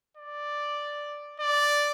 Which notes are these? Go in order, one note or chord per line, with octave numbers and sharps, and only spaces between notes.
D5
D5